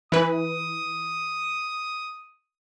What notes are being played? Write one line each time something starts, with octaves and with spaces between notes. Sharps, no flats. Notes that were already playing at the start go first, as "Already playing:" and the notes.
E3 B4 D#6